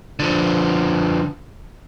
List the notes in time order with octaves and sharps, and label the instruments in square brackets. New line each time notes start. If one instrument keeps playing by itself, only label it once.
[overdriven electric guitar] D3 F3